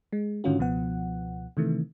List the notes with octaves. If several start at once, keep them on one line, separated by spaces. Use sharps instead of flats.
G#3
G#2 D3 D#3 C#4 F4 F#4
C#2 B2 F3 B3 F#5
C3 D#3 E3 A3